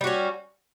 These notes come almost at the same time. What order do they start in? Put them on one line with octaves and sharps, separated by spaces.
G3 F#4 C#4